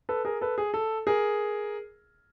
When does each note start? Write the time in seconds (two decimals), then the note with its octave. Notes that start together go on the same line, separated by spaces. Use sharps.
0.09 A4 B4
0.25 G#4 A#4
0.41 A4 B4
0.58 G#4
0.74 A4
1.07 G#4 A#4